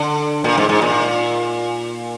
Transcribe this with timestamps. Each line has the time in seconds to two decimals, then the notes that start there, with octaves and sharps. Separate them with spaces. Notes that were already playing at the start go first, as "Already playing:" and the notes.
Already playing: D3
0.44 A#2
0.58 G#2
0.69 G#2
0.82 A#2